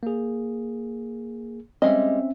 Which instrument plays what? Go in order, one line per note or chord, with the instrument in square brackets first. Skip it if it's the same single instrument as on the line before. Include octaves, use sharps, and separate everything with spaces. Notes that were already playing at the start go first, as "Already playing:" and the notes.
[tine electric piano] A#3 G#4
[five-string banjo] G3 G#3 D#5 [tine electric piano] C4 C#4 E5